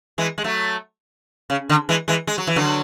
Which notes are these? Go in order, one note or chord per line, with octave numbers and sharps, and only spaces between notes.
E3 G#3
G#3
F#3 A3
C#3
D3
E3 G#3
E3 G#3
G#3
F#3
E3
D3 F#3